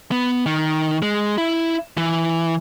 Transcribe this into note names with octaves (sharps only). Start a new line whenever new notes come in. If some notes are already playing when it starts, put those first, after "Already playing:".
B3
D#3
G#3
E4
E3